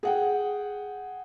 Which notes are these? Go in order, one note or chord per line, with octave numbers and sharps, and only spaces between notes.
G#4 F#5 G5